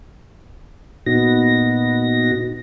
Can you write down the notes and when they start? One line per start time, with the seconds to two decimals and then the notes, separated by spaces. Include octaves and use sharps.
1.06 A#2 B3 D#4 F#4 A#6